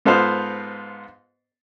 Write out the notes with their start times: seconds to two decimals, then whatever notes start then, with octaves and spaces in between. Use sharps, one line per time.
0.05 G#2 B3 F4 A4 C5 F5